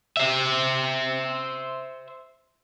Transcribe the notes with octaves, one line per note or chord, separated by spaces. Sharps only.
C5 E5